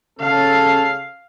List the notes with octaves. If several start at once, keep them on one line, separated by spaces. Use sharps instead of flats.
C#3 C#4 A4 F5